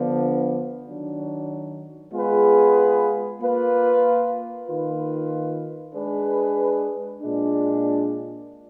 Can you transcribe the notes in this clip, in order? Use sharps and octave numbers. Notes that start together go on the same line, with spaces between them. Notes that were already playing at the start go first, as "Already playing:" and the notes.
Already playing: D3 F3 B3 D4
D#3 F#3 D4
G#3 B3 F4 G#4 B4
A#3 F4 B4
D#3 A#3 F4 B4
G#3 D4 G#4 B4
A#2 G#3 D4